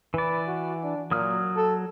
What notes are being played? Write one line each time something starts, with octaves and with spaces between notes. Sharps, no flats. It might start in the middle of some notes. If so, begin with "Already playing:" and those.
E3 B4 D5
F#4
D4
A#2 F#3 D#6 F6
A4